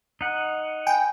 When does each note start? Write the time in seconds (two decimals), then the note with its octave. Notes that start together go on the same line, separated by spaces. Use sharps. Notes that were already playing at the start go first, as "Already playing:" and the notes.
0.21 D#4 F#5
0.87 G5 G#5 B5